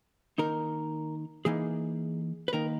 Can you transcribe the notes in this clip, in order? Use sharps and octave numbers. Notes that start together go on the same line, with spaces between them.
D#3 A#3 D#4 A#4
E3 A#3 D#4 G#4
B4
D#3 A#3 D#4 A#4